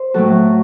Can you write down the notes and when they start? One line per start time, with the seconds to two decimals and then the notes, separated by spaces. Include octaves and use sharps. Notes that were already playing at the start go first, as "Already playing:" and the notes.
Already playing: C5
0.14 A2 F#3 F#4 A4